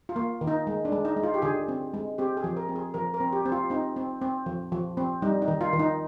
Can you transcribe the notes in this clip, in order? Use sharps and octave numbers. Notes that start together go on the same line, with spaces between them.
F4
A#3
D#3
D#4
G#3
D4
G#3
D#4
G#3
F4
G4
D3 G#4
C4
G#3
C4 G4
G#4
F3
A#4
C4
G#4
F3 A#4
A#4
C4
G4
C4
F4
C4 D#4
C4
C4
F3
F3
C4
G3 D#4
D#4
D#3
F4
D#3
D#4